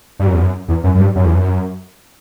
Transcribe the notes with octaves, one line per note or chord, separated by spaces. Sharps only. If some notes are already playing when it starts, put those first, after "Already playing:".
G2
F#2
E2
F#2
E2
F#2
F#2
G2
F#2
E2
F#2